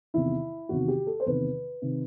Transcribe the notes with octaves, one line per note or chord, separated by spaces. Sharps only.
E2 C3 D#3 E4
E2 C3 D#3 F#4
G4
A4
C5
E2 C3 D#3 B4
C3 D#3